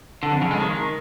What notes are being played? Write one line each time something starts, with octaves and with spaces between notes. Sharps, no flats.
D3
F2
C#3
G#3
D#3